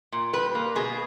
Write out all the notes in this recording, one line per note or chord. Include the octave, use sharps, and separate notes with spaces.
A#2
G3 B4
A#3
B2 G#4